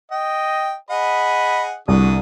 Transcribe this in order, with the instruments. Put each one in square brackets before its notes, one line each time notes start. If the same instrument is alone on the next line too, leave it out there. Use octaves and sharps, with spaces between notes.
[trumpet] D#5 [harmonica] G5
[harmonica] G#4 D#5 F#5 [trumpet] B5
[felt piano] C2 [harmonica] D3 D#6 [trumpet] F#4